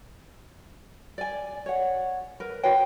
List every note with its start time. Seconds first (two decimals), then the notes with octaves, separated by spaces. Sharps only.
1.18 D5 G#5
1.66 C#5 F#5
2.40 A#4 B4
2.63 F#4 B4 C#5 G5